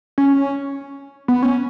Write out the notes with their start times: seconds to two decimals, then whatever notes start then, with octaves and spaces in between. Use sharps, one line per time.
0.18 C#4
1.28 B3
1.43 C#4